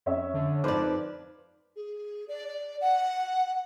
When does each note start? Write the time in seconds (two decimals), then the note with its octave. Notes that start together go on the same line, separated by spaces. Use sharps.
0.06 F2 C#4 E5
0.34 D3
0.64 F2 D#4 B4 C5 D5 D6
1.76 G#4
2.28 D5
2.47 D5
2.81 F#5